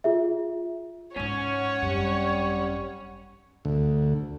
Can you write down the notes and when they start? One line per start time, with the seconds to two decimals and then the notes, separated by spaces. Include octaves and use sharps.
0.04 F4 G#4 E5
1.16 G#2 G#3 C#4 C#5 F#5
1.82 G#1 F#2 G3
3.65 D2